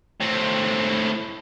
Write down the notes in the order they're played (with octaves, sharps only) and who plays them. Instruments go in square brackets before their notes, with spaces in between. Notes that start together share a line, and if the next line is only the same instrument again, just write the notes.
[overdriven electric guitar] A2 C4